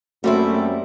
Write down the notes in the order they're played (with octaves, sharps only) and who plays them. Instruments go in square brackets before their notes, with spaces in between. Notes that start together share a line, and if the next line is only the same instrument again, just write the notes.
[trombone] F#2 [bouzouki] G3 C4 E4 [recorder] A3 [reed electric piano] A#3 F#4